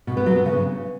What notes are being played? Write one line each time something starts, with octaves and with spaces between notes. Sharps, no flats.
B2
B3
F#3
B3
C#3